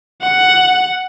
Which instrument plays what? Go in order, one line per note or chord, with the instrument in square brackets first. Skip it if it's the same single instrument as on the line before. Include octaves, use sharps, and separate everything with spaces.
[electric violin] F#5